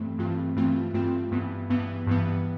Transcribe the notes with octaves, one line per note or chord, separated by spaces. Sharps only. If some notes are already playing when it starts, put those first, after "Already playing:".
Already playing: G2 E3 A3 C4
G2 E3 A3 C4 F4
G2 E3 A3 C4 F4
G2 E3 A3 C4 F4
G2 E3 B3
G2 E3 B3
G2 E3 B3